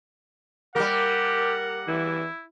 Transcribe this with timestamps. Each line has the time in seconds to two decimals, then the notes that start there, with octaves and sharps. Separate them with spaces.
0.76 G3 A#3 G4 A#4 F#5
1.88 E3 E4